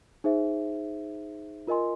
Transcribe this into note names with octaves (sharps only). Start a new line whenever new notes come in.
D#4 G#4 C5 E5
F4 A#4 D#5 G#5 C6